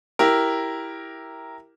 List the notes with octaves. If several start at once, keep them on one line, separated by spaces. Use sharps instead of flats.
E4 G4 A#4